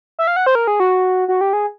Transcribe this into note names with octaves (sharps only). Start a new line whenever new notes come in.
E5
F5
F#5
C5
A#4
G#4
F#4
F#4
G4
G#4